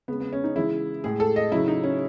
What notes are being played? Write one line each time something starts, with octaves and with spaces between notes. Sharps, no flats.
C#3 G#3 B3
B3
C#4
D#4
C#3 E3 G#3 E4
A2 G#3 G#4
A4
D#5
C#3 F#3 E4
D#4
C#4